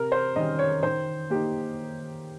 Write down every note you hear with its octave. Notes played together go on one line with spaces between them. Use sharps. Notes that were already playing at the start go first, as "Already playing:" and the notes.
Already playing: C3 A#4
C5
D#3 G3 C#4 D#5
C#5
D#3 C5
A#3 D#4 G4